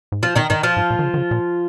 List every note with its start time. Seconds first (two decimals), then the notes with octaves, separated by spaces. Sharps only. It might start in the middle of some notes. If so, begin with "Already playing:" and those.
0.12 G#2
0.22 A#2 F3 F4
0.35 A#2 D#3 D#4
0.50 G#2 D#3 D#4
0.63 F3 F4
0.77 G#2
0.91 A#2
0.99 D#3
1.04 C#3
1.14 D#3
1.17 C#3
1.31 A#2